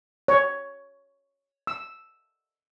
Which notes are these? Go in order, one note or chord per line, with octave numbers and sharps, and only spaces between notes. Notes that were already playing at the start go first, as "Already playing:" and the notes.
C#5
E6